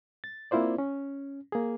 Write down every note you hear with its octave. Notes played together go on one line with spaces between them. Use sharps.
A6
A#3 C4 E4 F4 C5 D5
C#4
A#3 G#4